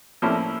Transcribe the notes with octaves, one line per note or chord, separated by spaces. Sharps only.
A2 F3 A#3 C#4 E4